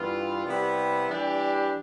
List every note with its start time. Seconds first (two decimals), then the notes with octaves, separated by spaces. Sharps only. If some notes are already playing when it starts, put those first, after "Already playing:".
Already playing: G2 E3 B3 F4
0.45 C3 G3 B3 E4 G4
1.08 E3 G3 D4 G4